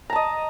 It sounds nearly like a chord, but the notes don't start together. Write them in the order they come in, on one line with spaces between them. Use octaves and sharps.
A#5 A5 D#5